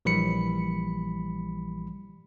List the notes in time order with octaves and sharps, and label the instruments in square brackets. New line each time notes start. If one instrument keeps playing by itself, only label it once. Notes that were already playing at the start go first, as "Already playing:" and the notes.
[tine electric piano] A#1 E3 G3 B5 C#7